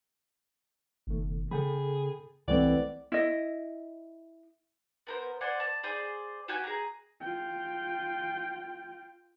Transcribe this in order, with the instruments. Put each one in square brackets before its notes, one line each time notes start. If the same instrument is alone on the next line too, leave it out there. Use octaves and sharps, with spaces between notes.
[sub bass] F#1 [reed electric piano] B2 D#3 A3
[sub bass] C#3 [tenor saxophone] G#4 [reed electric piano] A4 G5 B5
[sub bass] C2 [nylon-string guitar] E3 A3 C4 [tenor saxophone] D5 [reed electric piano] F#5
[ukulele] E4 D#5
[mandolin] B3 A#4 C5
C5 D5 F#5 G#5
A5
G#4 C5 D5
F#4 G4 G5 G#5
G#4 A#5
[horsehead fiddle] F4 G5